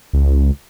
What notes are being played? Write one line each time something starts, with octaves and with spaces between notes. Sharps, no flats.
C#2